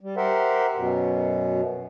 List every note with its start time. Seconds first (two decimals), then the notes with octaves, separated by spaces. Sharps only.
0.01 G3
0.17 G4 A#4 C5 E5 F#5
0.76 F#2 B2